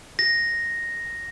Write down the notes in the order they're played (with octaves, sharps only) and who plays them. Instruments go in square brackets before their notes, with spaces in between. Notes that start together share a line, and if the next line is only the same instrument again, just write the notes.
[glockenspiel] A#6